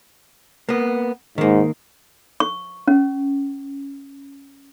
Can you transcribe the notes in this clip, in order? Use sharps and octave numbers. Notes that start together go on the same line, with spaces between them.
A#3 B3
G#2 D#3 A#3
C#6
C#4